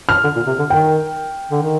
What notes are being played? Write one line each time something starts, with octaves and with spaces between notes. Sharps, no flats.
F6
D3
A#2
C3
D3
D#3 G5
D3
D#3